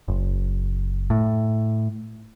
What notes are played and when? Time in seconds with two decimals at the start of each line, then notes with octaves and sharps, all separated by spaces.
0.08 F#1
1.10 A2